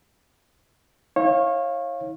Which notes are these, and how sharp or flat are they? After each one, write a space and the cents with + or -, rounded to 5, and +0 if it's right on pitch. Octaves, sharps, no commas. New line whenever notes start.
E4 -40 C#5 -30 F5 +0